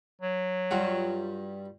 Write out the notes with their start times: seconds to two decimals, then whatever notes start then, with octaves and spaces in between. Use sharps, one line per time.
0.21 F#3
0.71 G2 G3 F4 F#4